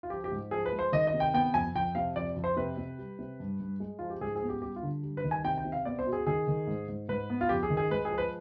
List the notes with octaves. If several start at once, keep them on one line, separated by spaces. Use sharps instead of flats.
F4
F3 G4
G4
G#2
F3 G#4
B4
G#3
C5
D#3 D#5
D#5
C3
G5
B3 G5
F2 G#5
F2 G5
C3 F5
F2 D5
F2
C5
C3 B4
C3
G3
C3
G2
G2
G#3
F3 F4
G4
G#2 G#4
G#4
B3
G4
G3 G4
F4
D3
G3
B4
D#3
G#5
C3 G5
G5
C3
F5
B3 D5
C5
B2
G#4
D#3 G#4
D#3
G#2
G#2
G#2 B4
B3
F4
F2 G4
G#4
D#3
G#4
G#3 B4
G#4
F3
B4